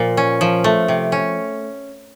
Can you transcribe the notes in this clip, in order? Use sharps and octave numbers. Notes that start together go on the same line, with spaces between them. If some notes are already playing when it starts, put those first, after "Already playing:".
Already playing: A#2 F3
C#4
F3
A3
C3
C#4